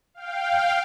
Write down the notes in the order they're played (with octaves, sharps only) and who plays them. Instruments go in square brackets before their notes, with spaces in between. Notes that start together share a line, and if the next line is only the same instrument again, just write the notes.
[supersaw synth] F5 G5